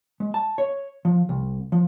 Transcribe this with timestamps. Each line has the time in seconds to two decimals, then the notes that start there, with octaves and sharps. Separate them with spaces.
0.20 G#3
0.34 A5
0.58 C#5
1.05 F3
1.29 C2
1.72 F3